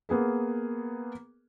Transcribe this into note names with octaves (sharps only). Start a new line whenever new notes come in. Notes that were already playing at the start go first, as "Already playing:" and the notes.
A#3 B3 G#4 A#4